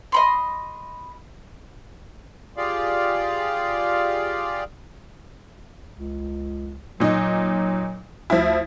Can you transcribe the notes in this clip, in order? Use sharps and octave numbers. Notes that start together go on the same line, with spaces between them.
D#5 B5 C6
F4 G4 G#4 D5 F5
C#2
A#2 F#3 D#4
D2 F3 E4